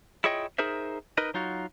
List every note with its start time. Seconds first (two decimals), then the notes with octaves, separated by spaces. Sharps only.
0.24 E4 F4 G#4 C#5 D#5 G5
0.58 D#4 G#4 A#4 C5 E5
1.17 D#4 A#4 B4 D#5
1.34 F#3 D#4 F4 F#4